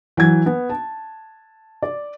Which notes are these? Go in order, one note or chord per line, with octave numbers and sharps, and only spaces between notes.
E3 F#3 G#6
B3
A5
D5